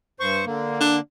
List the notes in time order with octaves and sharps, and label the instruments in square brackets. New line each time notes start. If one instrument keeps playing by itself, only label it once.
[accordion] G2 C5 C#6
D3 A#3
[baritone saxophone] D4